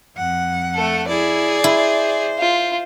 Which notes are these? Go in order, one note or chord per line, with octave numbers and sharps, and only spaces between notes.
F2 F#5
A3 A4
E4 G#4 D5
E4 C5
F4